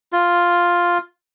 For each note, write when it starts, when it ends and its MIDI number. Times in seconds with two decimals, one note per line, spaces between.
0.13 0.98 65